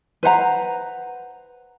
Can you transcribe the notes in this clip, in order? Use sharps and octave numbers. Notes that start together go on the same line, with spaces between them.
B4 C5 F#5 A#5